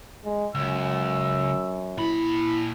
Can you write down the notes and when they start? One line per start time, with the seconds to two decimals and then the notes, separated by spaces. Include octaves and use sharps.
0.25 G#3
0.55 C#2 F#2 E6
1.98 A#2 E4 B5